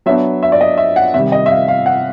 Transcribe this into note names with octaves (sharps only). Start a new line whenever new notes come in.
F#3 B3 D4 E5
E5
D5
D#5
E5
F#5
C3 D#3 G3 E5
D#5
E5
F5
F5
F#5